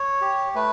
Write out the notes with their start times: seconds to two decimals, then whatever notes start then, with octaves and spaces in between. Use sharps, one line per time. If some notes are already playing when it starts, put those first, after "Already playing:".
Already playing: C#5
0.21 G4
0.55 A3 B4